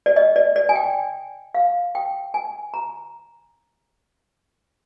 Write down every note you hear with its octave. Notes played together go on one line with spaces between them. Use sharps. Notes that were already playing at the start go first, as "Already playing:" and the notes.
D5
D#5
D5
D5
G#5
G5
F5
G5
G#5
A#5